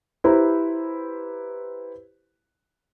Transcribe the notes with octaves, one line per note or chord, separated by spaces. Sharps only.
E4 G4 B4 C5 A#5 B5